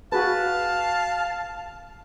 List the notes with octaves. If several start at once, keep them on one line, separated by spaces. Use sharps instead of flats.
F#4 G#4 B4 F5 A5